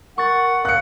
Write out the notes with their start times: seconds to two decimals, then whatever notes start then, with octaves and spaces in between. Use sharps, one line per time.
0.18 A#4 F#5 C#6 A6
0.65 F5 F#6 C#7